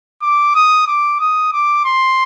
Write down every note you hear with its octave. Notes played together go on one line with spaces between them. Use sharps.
D6
D#6
D6
D#6
D6
C6